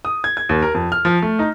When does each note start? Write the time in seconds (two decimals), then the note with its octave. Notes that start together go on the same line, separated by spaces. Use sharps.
0.05 D#6
0.24 G#6
0.37 G#6
0.49 D#2
0.62 A#4
0.75 F2
0.92 F6
1.05 F3
1.22 A3
1.39 D#4